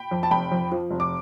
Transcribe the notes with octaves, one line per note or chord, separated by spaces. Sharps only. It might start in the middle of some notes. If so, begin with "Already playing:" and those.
Already playing: G5 B5
F2
A5
F1 G5 B5
F2
F3
F1
D6